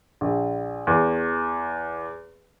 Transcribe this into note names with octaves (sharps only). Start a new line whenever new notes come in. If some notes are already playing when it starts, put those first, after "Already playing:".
A#1
E2